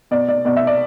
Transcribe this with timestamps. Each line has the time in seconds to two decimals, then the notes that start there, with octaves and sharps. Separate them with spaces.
0.11 B2 D5
0.28 D5
0.45 B2 D5
0.56 E5
0.67 D5